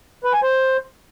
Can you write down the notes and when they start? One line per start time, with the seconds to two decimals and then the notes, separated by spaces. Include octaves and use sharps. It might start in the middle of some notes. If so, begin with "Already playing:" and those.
0.24 B4
0.33 G#5
0.43 C5